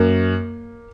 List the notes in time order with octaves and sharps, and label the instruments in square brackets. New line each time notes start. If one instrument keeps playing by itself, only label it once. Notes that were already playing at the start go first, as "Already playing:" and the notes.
Already playing: [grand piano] F#2 [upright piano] A#3